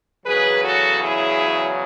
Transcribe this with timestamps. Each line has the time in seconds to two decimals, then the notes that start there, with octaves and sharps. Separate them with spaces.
0.25 E2 C#3 F#3 G#4 B4
0.63 F#4 A4
1.01 E4 G#4